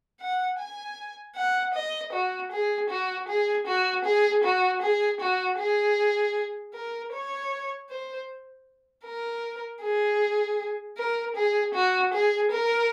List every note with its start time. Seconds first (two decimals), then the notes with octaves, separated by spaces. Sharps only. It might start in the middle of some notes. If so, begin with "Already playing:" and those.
0.20 F#5
0.59 G#5
1.36 F#5
1.74 D#5
2.13 F#4
2.51 G#4
2.90 F#4
3.28 G#4
3.67 F#4
4.05 G#4
4.44 F#4
4.82 G#4
5.20 F#4
5.59 G#4
6.75 A#4
7.13 C#5
7.90 C5
9.05 A#4
9.82 G#4
10.97 A#4
11.36 G#4
11.74 F#4
12.13 G#4
12.52 A#4